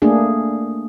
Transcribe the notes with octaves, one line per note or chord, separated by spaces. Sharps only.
A3 A#3 D4 G#4